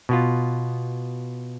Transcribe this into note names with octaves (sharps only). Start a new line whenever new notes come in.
B2 B3 F4